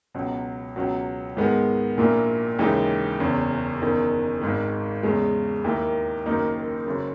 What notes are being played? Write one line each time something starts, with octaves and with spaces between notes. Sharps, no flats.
C#2 B2 F#3
C#2 B2 F#3
G#2 D#3 G#3 B3
A#1 A#2 A#3 E4
D#2 C#3 E3 G#3 D#4
F#1 E2 C#3
F#1 E2 D#3
G#1 G#2 D#3
E2 C#3 G#3
D#2 D#3 A#3 E4
F#1 F#2 D#3 A#3 D#4
F#1 F#2 C#3